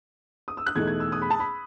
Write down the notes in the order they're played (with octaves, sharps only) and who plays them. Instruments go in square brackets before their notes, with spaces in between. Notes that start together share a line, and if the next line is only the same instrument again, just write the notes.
[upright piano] D#6
E6
F#6
E2 B2 A3 D#4 G#6
G#6
E6
D#6
B5
A5
B5